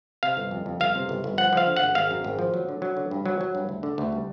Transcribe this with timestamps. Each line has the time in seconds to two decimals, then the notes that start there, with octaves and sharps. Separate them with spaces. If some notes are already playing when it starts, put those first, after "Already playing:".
0.23 C3 F5
0.37 G1
0.51 F2
0.66 F2
0.80 G1 F5
0.95 C3
1.09 G1
1.24 G1
1.38 F3 F#5
1.53 F3 F5
1.67 D3
1.76 F#5
1.82 G#1
1.95 G#1 F5
2.11 F#2
2.24 G#1
2.39 F3
2.54 F#3
2.69 D3
2.82 F#3
2.97 D3
3.11 G2
3.26 F#3
3.41 F#3
3.55 G2
3.69 D2
3.83 D3
3.98 D2
4.12 G3